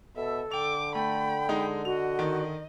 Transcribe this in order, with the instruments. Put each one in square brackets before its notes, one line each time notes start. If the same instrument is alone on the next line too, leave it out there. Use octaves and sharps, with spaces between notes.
[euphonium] B2 [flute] A4 [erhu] E5
[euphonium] D3 [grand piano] G5 F7 [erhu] D6
[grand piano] A3 [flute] G5 [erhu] B5
[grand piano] G#3 D#4
[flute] F#4 [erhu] D#5 [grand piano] F7
[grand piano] D#3